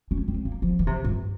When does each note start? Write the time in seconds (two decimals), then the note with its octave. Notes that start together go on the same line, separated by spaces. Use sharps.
0.11 C#4
0.28 C4
0.45 A#3
0.62 F3
0.79 E3
0.87 C3
1.04 G2